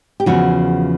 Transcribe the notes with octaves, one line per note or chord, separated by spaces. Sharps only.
G4
E2 C#3 F3 F#4